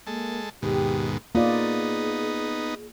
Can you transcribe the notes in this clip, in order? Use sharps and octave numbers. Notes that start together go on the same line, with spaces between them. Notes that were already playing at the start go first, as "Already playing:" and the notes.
G#3 A#3 A4
D#2 G#2 B2 G4
A#3 B3 D#4 F4 G#4 D5